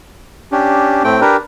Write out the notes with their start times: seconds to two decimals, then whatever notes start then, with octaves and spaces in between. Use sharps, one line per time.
0.52 C#4 D4 G4
1.04 A2 A3 C4 G5
1.21 D4 G4 A#4 B4